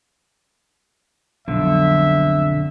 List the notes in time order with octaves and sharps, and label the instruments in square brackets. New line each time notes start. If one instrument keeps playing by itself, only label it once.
[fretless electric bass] B1 [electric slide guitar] F2 D3 [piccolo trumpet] E5